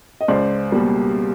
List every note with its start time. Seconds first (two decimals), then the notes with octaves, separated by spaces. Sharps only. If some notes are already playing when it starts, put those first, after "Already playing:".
0.21 D#5
0.28 C#2 C5 D5
0.72 B2 G3 A#3